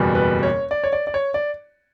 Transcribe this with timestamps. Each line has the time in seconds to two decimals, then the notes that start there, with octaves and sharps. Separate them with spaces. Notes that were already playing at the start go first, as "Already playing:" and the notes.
Already playing: F#1 E2 B2 G3
0.15 B4
0.43 C#5
0.71 D5
0.84 C#5
0.93 D5
1.07 D5
1.14 C#5
1.34 D5